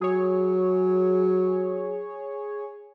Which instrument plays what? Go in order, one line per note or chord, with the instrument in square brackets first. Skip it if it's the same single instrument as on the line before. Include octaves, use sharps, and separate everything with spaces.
[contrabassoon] F#3 [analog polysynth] G#4 C#5